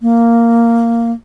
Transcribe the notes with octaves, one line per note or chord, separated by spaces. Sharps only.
A#3